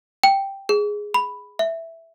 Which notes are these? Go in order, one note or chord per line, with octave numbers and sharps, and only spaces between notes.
G5
G#4
B5
E5